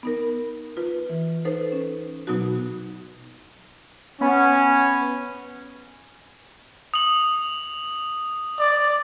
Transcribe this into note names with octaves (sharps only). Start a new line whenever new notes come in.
B3 D#4 A#4
F4 B4
E3
D#4 A4 B4 C5
C#4
B2 F#3 B3 D#4 F#4
B3 C#4
D#6 F#7
D5